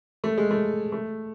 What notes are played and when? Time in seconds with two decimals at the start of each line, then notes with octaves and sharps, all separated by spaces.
0.24 A3
0.37 G#3
0.51 A3
0.92 A3